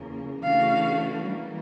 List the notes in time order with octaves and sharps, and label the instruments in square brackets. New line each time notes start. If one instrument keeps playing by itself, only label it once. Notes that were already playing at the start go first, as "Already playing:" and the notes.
Already playing: [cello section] E2 C#3 F3 A#3
[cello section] C#3 E3 A3 D4 F#4 [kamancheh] F5
[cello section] E3 G3 A#3